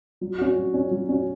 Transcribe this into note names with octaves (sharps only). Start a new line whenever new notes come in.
F#3
C#4 F#4
F#3
C#4 F#4
F#3
C#4 F#4